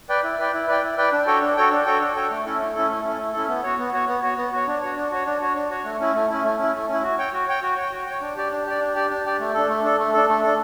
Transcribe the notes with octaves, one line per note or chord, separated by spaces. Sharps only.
B4 D5 G5
E4
B4 D5 G5
E4
B4 D5 G5
E4
B4 D5 G5
D4
F#4 A4 C#5 G5
D4
F#4 A4 C#5 G5
D4
F#4 A4 C#5 G5
D4
F#4 A4 C#5 G5
A3
C#4 E4 A4
A3
C#4 E4 A4
A3
C#4 E4 A4
A3
C#4 E4 A4
B3
F#4 C#5
B3
F#4 C#5
B3
F#4 C#5
B3
F#4 C#5
D4
F#4 C#5
D4
F#4 C#5
D4
F#4 C#5
D4
F#4 C#5
A3
C#4 E4
A3
C#4 E4
A3
C#4 E4
A3
C#4 E4
F#4
C#5 G5
F#4
C#5 G5
F#4
C#5 G5
F#4
C#5 G5
D4
G4 D5
D4
G4 D5
D4
G4 D5
D4
G4 D5
A3
D4 A4
A3
D4 A4
A3
D4 A4
A3
D4 A4